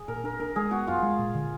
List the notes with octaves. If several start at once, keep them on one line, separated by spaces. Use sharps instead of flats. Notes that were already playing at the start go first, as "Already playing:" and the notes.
Already playing: G#4
A#2 A#4
D4 A#4
D4 A#4
G#3 G#4
B3 F#4
F#2 F4
G#3
A#2
D3